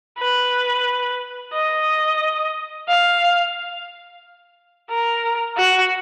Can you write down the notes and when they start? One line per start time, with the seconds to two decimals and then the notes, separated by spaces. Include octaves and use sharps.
0.18 B4
1.53 D#5
2.88 F5
4.90 A#4
5.57 F#4